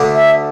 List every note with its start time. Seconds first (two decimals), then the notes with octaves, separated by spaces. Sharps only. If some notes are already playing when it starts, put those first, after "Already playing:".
Already playing: D2 D3 A3 D4
0.13 E5